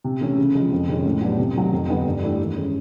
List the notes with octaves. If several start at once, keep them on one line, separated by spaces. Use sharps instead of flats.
C3
E3 A3 C#4 E4
C#3
F3 G#3
F2
C3 D#3 G#3 C#4
A2
F#3 B3 D4 G4
C3
D#3 F#3 A3
F2
D3 G3 B3 D#4
G2
E3 A3 D4 G4
D#3
G#3 C#4